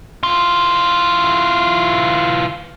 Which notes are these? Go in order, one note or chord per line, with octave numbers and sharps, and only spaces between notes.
E3 F4